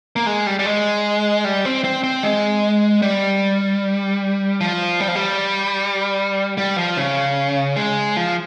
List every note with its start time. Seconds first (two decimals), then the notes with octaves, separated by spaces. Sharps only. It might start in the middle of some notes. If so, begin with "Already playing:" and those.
0.16 A#3
0.26 G#3
0.47 G3
0.59 G3
0.66 G#3
1.45 G3
1.65 C4
1.84 C4
2.04 C4
2.23 G#3
3.02 G3
4.61 F3
5.00 G3
5.08 F3
5.15 G3
6.58 G3
6.78 F3
6.97 C#3
7.76 G#3
8.17 F3